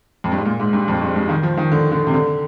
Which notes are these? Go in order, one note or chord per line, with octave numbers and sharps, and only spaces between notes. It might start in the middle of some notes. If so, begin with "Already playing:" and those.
F2
G2
G#2
A#2
G#2
G2
F2
G2
G2
D#3
F3
D#3
D3
D3
C3
D3